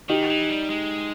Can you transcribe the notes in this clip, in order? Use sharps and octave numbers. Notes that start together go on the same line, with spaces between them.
D#3 D#4 G4
E3
G3
G#3